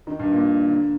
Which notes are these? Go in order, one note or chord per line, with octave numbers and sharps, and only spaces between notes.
D#3
G2
A#2
D3